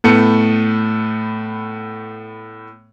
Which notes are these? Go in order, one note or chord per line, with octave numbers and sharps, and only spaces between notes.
A2 A3 B3 C#7